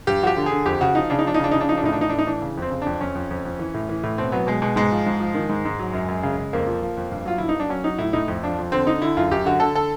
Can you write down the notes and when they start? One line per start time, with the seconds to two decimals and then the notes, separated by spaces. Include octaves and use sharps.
0.07 G2 G4
0.23 F3 F#4
0.27 G4
0.37 D3
0.46 G#4
0.51 D3
0.66 F2 G4
0.81 C#3 F#4
0.95 F3 D#4
1.10 C#3 D4
1.19 D#4
1.25 F3 D4
1.34 D#4
1.39 C#3 D4
1.51 C#3 D#4
1.60 D4
1.69 F3 D#4
1.77 D4
1.83 A2 D#4
1.93 D4
1.97 E3 D#4
2.09 A2 D4
2.18 D#4
2.27 E3 D4
2.42 C#3
2.57 F2 C4
2.71 C#3
2.82 F2 D4
3.01 F2 C#4
3.15 F2
3.31 F2
3.45 F2
3.59 E3
3.74 A2
3.89 E3
4.03 A2
4.18 B2 C4
4.32 F#3 B3
4.47 B2 G#3
4.62 B2 G#3
4.76 G#2 G#3
4.92 F3
5.06 G#2
5.20 F3
5.35 D#3
5.49 G#2
5.65 G#2
5.79 F#3
5.93 F#2
6.08 F#2
6.23 C#3
6.38 C#3
6.53 F2 A#3
6.67 F3
6.82 F3
6.97 F2
7.11 G2
7.25 F#3 F4
7.38 G2 E4
7.49 D#4
7.55 F#3
7.60 D4
7.69 F#3 C#4
7.84 F#3 D#4
7.98 A2 E4
8.13 A2 D#4
8.28 F2
8.43 F3 D4
8.58 F2
8.72 D3 C4
8.86 D3 D#4
9.02 D3 E4
9.17 F#2 F4
9.31 F#2 G4
9.45 D3 F#4
9.60 D3 A4
9.75 A4